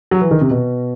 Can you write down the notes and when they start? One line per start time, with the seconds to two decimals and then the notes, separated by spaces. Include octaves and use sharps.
0.11 F#3
0.21 E3
0.31 D#3
0.41 C3
0.51 B2